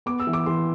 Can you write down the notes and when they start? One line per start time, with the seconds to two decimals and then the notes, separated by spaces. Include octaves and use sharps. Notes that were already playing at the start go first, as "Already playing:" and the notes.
0.06 B3 D6
0.20 E6
0.27 E3
0.33 D6
0.46 E3 C6